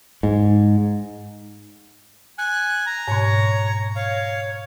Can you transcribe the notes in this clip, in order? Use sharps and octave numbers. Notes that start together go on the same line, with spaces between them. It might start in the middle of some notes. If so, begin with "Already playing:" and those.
G#2
G#5 F#6
A#5
G#2 B2 C#5
C#5 F5